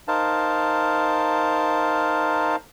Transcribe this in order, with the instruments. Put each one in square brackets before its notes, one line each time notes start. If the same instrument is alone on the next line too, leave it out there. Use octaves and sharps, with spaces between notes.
[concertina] D#4 A#4 C5 F5 A5